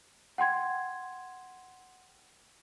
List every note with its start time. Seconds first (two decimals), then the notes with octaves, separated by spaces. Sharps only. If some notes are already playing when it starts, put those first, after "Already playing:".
0.38 F#5 G5 C6 G#6